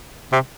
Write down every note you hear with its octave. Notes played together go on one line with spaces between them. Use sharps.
C3